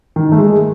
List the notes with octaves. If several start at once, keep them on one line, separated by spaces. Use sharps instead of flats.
D#3
A3
G#3